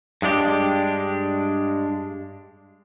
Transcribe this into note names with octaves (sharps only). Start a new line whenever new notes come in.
G2 G#3 D4 G4